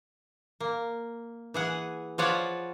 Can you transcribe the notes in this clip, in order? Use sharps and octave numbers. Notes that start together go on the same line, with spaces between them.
A#3
E3 G#4 F#5
F3 F4 B4 C#5 D5 F#5